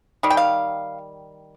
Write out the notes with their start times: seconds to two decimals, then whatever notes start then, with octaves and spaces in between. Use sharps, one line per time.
0.23 D#3 G3
0.30 G5
0.37 F5